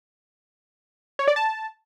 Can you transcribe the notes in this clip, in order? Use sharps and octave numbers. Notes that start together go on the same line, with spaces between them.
C#5
D5
A5